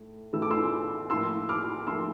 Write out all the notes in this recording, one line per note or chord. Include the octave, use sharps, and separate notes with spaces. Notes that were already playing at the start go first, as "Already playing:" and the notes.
Already playing: A2 A3
A2 E3 A3 E6
D6
C6 E6
A2 F3 A#3 C6 E6
D6 F6
A2 F3 A#3 C6 E6